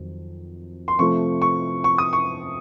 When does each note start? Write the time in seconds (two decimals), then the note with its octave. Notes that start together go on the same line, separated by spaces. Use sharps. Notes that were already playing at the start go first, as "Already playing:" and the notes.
Already playing: F2 D#3 F#3
0.88 C6
0.99 C3 F3 A3 C#6
1.42 C#6
1.84 C#6
1.98 D#6
2.13 C#6